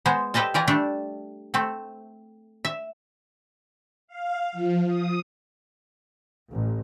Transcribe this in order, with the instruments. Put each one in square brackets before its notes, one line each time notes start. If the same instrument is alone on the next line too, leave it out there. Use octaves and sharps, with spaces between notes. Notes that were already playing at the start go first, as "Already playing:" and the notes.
[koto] G#3 B3 C5
G4 A4 B4 C5 D#5 A5
E3 F4 G4 D5 G#5 A#5
G3 A3 D4 A4
A3 C4 A4
E5
[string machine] F5
F3
D#6
[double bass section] A1